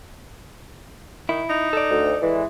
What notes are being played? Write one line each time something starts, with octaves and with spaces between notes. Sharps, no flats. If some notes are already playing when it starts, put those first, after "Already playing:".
D#3 E4
D#4
A4 D5
D2
E3 G#3